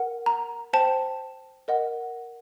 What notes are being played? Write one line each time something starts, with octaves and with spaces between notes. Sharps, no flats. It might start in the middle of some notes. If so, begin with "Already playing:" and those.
Already playing: A#4 F#5
A#5
C5 G5 A5
A#4 D#5 F#5